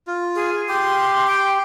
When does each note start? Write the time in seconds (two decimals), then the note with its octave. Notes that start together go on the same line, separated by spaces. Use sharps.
0.07 F4
0.35 G#4
0.69 G4 C6
1.27 G5